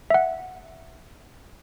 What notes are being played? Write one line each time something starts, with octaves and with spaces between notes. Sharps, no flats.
E5 F#5